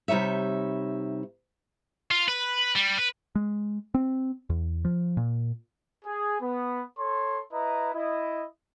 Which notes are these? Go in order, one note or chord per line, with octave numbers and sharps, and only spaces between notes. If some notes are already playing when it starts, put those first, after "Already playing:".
C3 G3 D#4 C#5 E5
F4
B4
G3
B4
G#3
C4
E2
F3
A#2
G#4
B3
A4 C#5 C6
E4 B4 D#5 A#5
E4 D#5